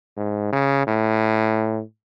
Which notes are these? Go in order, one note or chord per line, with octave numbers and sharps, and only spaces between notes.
G#2
C#3
A2